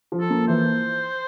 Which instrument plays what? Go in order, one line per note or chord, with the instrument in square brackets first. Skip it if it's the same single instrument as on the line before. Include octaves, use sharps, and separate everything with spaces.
[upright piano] F3
[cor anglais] A4
[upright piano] A#3
[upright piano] E3 [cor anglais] C5